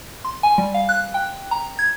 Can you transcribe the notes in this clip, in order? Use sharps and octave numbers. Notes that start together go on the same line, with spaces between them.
C6
G#5
G3
F5
F#6
G5
A#5
G#6